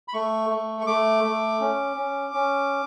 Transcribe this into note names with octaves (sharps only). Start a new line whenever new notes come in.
B5
A3 C#6
A3
C#6
A3 D6
A3
C#4
C#4
C#4